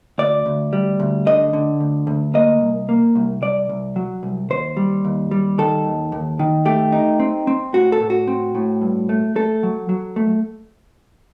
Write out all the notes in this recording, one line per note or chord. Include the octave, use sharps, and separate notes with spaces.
D2 D5
D2
G3
D2
D3 D#5
D3
D2
D2
A#3 D#5
C2
A#3
C2
C2 D5
C2
F#3
C2
D#2 C5
G3
D#2
G3
D#3 A4
D#2
D#2
D#3
A3 G4
D#4
C4
C4
A2 F#4
A4
A2
F#4
C4
A2
G2
A3
A3 A4
F#3
F#3
A3